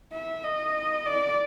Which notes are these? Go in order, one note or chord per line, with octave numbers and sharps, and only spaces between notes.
E5
D#5
D5